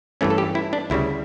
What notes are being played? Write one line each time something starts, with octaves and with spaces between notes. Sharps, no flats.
G2 E3 A3 C#4
A4
G4
E4
D4
D2 C#3 G3 E4